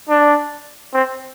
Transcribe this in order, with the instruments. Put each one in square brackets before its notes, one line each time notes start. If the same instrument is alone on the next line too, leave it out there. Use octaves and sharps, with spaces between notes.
[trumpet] D4
C4